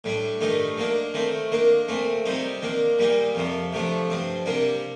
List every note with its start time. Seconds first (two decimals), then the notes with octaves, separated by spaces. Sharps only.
0.04 A2 G3 D4
0.41 G2 D#3 A3 D#4
0.78 D#3 A#3 D4
1.14 D#3 A3 C4
1.52 D#3 A#3 D4
1.88 A#2 A3 C4
2.25 C3 G3 C4 D#4
2.63 D#3 A#3 D4
2.99 A#2 G3 A#3 D#4
3.35 F2 C3 F3
3.73 C3 F3 A3 D4
4.10 G2 F3 C4
4.46 C3 G3 A#3 D4